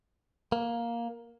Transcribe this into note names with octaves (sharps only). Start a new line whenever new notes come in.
A#3